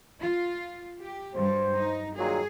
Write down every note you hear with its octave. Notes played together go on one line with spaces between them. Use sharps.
F4
G4
G2 F#3 G3 C5
D#4
A#2 D#3 F#3 G#4